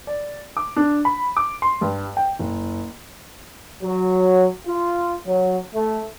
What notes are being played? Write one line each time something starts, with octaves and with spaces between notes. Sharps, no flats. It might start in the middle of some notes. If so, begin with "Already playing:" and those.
D5
D6
D4
B5
D6
C6
G2
G5
F#1
F#3
F4
F#3
A3